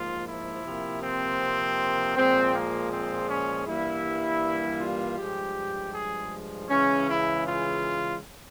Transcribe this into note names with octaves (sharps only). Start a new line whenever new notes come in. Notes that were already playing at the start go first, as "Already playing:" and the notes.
Already playing: G#2 F3 A#3 F4
E4
C3 F3 A#3
C4
A#2 F3 G#3 C4
A#3
C4
C#4
G2 E3 G3 A#3 E4
F4
G2 F3 G#3 G4
G#4
C#3 E3 G#3 C#4
E4
F4